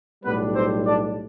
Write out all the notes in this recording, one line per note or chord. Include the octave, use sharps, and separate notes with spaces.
B1 A2 G3 B3 D4 B4
C4 C5
D4 D5